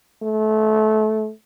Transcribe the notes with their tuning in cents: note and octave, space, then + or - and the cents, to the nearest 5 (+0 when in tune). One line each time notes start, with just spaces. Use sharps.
A3 -25